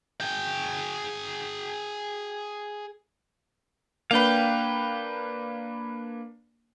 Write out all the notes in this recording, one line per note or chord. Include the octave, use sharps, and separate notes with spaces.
G#4 G5
A#3 D4 B4 F5 G5